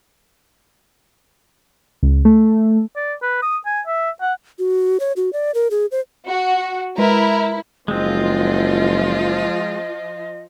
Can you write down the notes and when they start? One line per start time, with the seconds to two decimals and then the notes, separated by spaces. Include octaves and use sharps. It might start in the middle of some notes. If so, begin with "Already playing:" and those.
2.03 C#2
2.25 A3
2.96 D5
3.22 B4
3.43 D#6
3.66 G#5
3.87 E5
4.21 F#5
4.59 F#4
5.00 C#5
5.17 F#4
5.33 D5
5.54 A#4
5.71 G#4
5.92 C5
6.27 F#4
6.98 G#3 E4 A#4 B4
7.88 F#1 F3 G#3 C4 F4 D#5